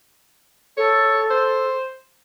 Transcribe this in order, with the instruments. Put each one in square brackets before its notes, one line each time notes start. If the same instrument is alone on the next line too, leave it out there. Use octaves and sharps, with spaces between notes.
[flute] A4 [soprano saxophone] C#5
[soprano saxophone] C5